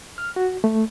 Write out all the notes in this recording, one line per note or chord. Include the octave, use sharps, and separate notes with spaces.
F6
F#4
A3